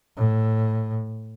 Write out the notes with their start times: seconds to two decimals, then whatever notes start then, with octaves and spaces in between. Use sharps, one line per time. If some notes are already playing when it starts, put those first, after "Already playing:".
0.17 A2